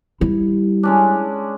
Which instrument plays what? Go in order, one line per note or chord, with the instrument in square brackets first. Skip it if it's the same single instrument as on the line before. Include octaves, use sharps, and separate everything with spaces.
[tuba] G3 [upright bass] E4
[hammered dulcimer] G#3 C#4 D4